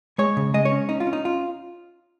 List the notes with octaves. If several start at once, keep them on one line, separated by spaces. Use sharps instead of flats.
G#3 C#5
C#3
G#3 D#5
C#5
C#4
C#4 D#4
F4
C#4
D#4
F4